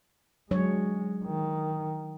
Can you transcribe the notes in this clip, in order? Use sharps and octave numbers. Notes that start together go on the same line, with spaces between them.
F#3 G#3 D4 C#5
D#3